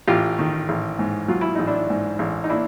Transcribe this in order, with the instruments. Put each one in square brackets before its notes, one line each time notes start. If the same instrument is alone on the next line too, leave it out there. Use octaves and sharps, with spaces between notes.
[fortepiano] A1 F4 G4
D#3
A1
G#2
F#3 F4
E4
A1 D#4
D4 E4
G#2
A1
D#4
A#3 D4 E4